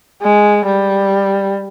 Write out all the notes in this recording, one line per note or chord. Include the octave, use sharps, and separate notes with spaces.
G#3
G3